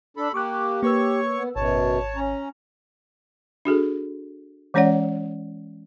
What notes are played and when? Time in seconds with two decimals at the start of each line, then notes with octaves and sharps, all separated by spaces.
0.17 D4 A4 B5
0.34 A#3 G4 C#6 D6 F#6
0.83 A#3 B4 C#5 C#6 E6
1.35 B3
1.56 G#1 F#2 B2 C#5 A5
2.16 C#4 A#5
3.65 D4 F#4 G#4 A4
4.74 E3 G#3 C#4 C#5 D5 F#5